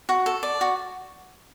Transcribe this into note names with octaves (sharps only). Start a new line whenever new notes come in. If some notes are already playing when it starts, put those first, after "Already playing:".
F#4
A4
D5
F#4